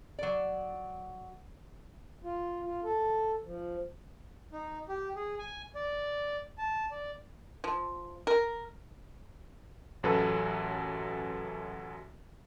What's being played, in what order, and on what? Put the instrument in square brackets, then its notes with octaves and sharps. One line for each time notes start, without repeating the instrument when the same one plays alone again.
[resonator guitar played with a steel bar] F#3 D5
[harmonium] F4
F4
A4
F3
[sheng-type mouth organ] D#4
G4
G#4
G#5
D5
A5
D5
[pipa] F3
A#4
[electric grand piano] A1 F#2 F#3 A4 B4